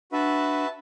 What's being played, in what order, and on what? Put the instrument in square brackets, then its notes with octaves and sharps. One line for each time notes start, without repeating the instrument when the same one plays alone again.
[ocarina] D4 [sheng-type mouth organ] F#4 B4 E5 A5